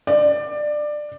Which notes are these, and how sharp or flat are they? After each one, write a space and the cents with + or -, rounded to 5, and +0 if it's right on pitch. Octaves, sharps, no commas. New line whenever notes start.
D5 +20